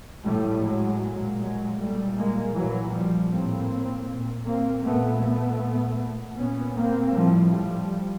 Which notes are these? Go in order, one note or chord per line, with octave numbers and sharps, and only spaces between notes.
A2 G3 A3
F#3 G#3
A#2
F#3 G#3
A#2 G3 A3
G#3 A#3
A#2 E3 F#3
F3 G3
A2 A#3 C4
A#2
A#3 C4
A#2 A3 B3
A3 B3
A#2
A#2 B3 C#4
A#3 C4
A2 F3 G3
F3 G3